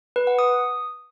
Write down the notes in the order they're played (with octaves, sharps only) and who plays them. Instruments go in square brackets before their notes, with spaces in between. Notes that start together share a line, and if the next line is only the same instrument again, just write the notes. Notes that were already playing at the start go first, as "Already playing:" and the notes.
[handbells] B4
F#5
D#6